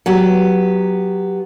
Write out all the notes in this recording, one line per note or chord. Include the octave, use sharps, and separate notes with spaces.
F#3 B3 G4